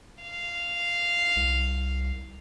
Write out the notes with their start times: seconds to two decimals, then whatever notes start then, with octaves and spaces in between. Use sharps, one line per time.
0.23 F5
1.36 C2